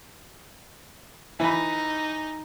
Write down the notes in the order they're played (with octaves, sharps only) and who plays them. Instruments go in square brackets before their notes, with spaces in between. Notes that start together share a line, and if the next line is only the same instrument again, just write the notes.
[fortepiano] E3 B5 [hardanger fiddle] D#4